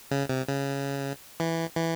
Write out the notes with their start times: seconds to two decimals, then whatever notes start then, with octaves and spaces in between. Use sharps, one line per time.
0.11 C#3
0.29 C3
0.48 C#3
1.40 E3
1.76 E3